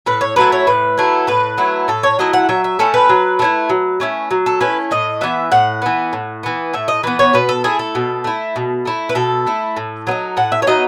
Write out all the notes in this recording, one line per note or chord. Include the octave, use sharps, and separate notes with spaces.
A2 B4
C#5
F#3 A3 E4 B4
C#5
A2 B4
F#3 A3 E4
A2 B4
F#3 A3 E4
A2 A4
C#5
F#3 A3 E4 D#5
F#5
F#3 E5
E5
A3 C#4 E4 A4
B4
F#3
A3 C#4 E4
F#3
A3 C#4 E4
F#3
A4
A3 C#4 E4 B4
A2 D#5
E3 B3 E5
A2 F#5
E3 B3
A2
E3 B3
A2 E5
D#5
E3 B3 B4
C#5
B2 B4
A4
A3 E4 G#4
A4
B2
A3 E4
B2
A3 E4
B4
B2 A4
A3 E4
A2
F#3 B3 D#4
A2 F#5
E5
C#5
F#3 B3 D#4 D#5